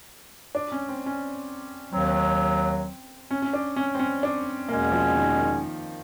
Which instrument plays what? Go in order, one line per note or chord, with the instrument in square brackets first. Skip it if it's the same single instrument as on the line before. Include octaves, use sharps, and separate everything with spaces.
[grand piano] D4
C#4
C4
C#4
[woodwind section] D#2 D#3 F#3 [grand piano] C4
[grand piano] C#4
C#4
D4
C#4
C4
C#4
D4
[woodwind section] E2 B2 G#3 C#4 [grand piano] A#3
[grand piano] F3
D#3
D#3